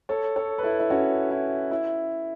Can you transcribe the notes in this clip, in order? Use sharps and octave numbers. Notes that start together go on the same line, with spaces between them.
A4 C#5
A4 C#5
B4
E4 A4
E4
C#4 F#4
E4
E4